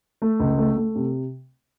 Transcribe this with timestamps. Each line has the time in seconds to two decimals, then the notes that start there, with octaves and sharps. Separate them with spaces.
0.22 A3
0.40 C#2
0.58 A3
0.77 A3
0.95 C3